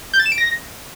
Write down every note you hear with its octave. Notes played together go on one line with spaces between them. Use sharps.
G6
A6
E7
D7
A#6